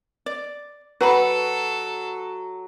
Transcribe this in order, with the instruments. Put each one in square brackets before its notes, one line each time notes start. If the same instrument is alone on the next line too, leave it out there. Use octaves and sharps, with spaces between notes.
[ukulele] D5
[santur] F#3 [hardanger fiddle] A4 [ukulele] B4 B5